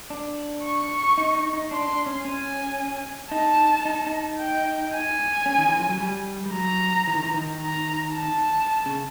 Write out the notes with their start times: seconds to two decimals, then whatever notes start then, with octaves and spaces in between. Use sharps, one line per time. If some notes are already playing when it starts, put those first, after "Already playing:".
0.10 D4
0.64 C#6
1.18 D#4
1.35 D#4
1.53 D#4
1.71 D4 C6
1.88 D4
2.06 C#4
2.24 C#4 G#5
3.31 D#4 A5
3.85 D#4
4.07 D#4
4.39 G5
4.93 G#5
5.46 C#4
5.58 D#3
5.68 E3
5.79 F3
5.89 F#3
6.00 G3
6.46 G3
6.54 F#3 A#5
7.07 E3
7.15 D#3
7.24 E3
7.34 D#3
7.61 A#5
8.14 A5
8.86 C#3